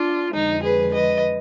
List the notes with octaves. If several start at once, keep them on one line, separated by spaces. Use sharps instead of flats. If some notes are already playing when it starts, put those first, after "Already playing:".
Already playing: D4 F4
F2 D3 F3 G#3 D#4
G#4 B4
B4 D#5